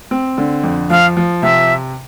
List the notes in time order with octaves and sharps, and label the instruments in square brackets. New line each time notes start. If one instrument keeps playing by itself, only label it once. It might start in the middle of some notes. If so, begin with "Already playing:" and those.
[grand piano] C4
D3
F2
[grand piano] F3 [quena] F5
[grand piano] F3
[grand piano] C3 [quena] E5